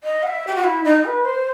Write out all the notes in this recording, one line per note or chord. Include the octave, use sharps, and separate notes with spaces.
D#5
F#5
E5
G4
F#4
E4
D#4
B4
C5